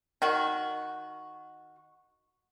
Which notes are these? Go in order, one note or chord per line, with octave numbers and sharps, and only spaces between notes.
D#3 F#4